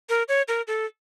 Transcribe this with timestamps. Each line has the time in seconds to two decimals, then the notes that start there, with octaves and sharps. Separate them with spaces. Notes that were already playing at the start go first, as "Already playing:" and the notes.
0.09 A#4
0.28 C#5
0.48 A#4
0.68 A4